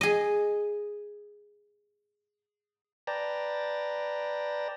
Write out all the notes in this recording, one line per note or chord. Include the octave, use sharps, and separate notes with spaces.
G#4 D#5
B4 D5 G5 A5 A#5